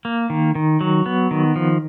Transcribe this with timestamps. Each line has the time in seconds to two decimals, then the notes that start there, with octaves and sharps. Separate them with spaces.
0.05 A#3
0.30 D#3
0.55 D#3
0.81 F#3
1.06 B3
1.31 D#3
1.56 F3